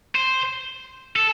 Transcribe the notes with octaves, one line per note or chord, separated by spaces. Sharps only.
C5
A4